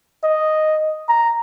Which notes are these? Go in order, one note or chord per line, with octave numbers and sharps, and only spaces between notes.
D#5
A#5